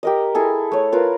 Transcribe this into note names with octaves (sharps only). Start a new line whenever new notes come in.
G4 A#4 D#5
E4 G#4 A4
A3 C#5
F4 A#4 B4